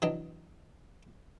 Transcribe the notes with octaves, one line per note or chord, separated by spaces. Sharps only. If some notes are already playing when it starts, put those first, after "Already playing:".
E3 F#3 D4 D#5